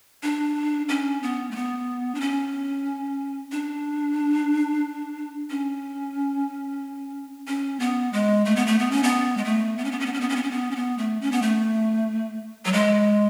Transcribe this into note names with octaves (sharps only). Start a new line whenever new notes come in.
D4
C#4
B3
A3
B3
D4
C#4
D4
C#4
C#4
B3
G#3
A3
B3
A3
B3
C#4
B3
G#3
A3
B3
C#4
B3
C#4
B3
C#4
B3
C#4
B3
C#4
B3
C#4
B3
A3
C#4
B3
A3
F#3
G#3